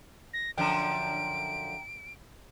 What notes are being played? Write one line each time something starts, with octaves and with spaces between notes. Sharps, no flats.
A#6
F#2 D3 F3 G5 A#5 D7